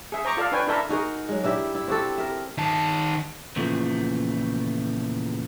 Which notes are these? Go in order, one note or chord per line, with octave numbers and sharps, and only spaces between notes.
G#4 E5
C5 A#5 C#6 D6
F4 A4 D5 F5
D4 B4 C#5 G5 G#5
D4 E4 A4 A#4 E5 A5
D#4 F#4 G#4 A#4
F#3 G#3
D4 E4 G4 E5
E4
C4 F#4 G4 A4
A#4 E5
D#3 A5
E2 A#2 C#3 E3 F3 A3